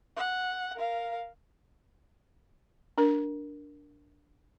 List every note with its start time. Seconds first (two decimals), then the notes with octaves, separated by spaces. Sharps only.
0.17 F#5
0.76 A#4 F5
2.98 D4 A#4